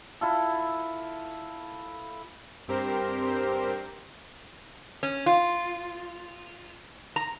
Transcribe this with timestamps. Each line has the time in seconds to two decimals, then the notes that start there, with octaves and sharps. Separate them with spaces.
0.21 E4 F4 A4
2.68 G2 C4 G4 A#4 C5
5.03 C#4
5.26 F4
7.16 A#5